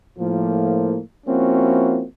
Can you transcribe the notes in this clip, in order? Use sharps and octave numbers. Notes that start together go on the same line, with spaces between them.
A2 F3 A#3
F3 A#3 C4 C#4 E4 F#4